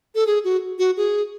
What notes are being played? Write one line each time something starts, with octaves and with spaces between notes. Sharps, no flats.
A4
G#4
F#4
F#4
G#4